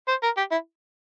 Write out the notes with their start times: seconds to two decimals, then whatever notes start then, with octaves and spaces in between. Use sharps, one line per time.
0.08 C5
0.23 A#4
0.37 G4
0.51 E4